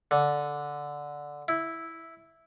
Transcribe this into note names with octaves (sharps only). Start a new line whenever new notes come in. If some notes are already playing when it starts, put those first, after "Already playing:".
D3
E4